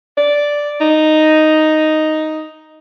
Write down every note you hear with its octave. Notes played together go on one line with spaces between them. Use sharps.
D5
D#4